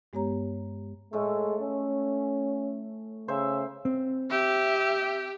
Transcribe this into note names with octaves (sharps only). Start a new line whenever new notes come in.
G2 G#3 B3 G4 C#5 A#5
A2 G#3 A3
C#4
C#3 C5 E5
C4
G4 E5